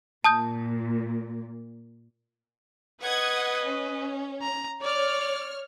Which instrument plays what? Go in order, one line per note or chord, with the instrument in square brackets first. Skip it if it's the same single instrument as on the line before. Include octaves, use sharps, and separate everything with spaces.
[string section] A#2 [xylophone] A5 D#6 G6
[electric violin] B4 D#5 [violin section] F#5 D#6 G#6
[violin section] C#4
[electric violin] A#5
[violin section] C#5 F6 [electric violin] D5